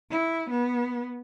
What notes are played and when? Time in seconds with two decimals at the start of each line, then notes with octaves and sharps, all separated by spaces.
0.10 E4
0.50 B3